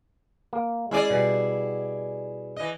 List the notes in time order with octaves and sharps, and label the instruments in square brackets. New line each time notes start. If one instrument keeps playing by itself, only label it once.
[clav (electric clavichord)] A#3
[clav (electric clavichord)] G#3 C#4 [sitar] E4 G#4 D5
[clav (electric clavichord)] B2 G3
[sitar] E3 D#5